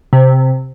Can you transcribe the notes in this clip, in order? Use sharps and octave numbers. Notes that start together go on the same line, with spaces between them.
C3